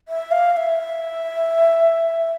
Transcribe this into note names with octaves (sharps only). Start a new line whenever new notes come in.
E5
F5
F5
E5